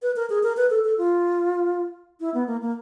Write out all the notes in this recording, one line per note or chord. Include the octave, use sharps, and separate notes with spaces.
B4
A#4
G#4
A#4
B4
A4
A4
F4
E4
B3
A#3
A#3